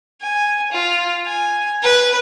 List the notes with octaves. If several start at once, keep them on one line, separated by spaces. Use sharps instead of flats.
G#5
F4
G#5
B4